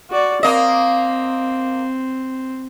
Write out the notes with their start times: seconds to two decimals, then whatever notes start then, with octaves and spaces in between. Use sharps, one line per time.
0.10 F#4 D5
0.43 A#3 C4 D#5